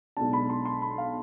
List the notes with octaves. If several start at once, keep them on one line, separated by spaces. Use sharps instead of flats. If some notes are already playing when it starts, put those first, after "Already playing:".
B1 B2 G#3 D4 A5
B5
C6
C6
B5
F5